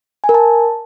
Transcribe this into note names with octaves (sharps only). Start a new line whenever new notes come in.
G#5
A#4
A5